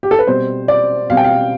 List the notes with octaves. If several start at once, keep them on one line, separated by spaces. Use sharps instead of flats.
G4
A4
B4
B2 G3 C4 C5
D5
B2 G3 C4 F5
G5
F5